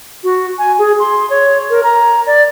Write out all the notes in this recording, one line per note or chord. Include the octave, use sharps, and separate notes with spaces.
F#4
G#5
G#4
C6
C#5
A#4
A#5
D5